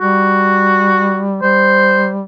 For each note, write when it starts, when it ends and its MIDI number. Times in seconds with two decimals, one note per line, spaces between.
0.01 1.40 55
0.01 1.25 66
1.43 2.22 55
1.43 2.10 72